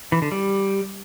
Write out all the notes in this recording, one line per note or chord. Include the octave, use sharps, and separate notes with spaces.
E3
D3
G3